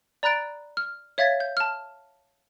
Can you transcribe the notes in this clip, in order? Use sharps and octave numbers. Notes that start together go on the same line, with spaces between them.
D5 A#5 B5 F#6 A6 D7
F6
C#5 E5 F5 G#6 A6 B6
G6
A5 F6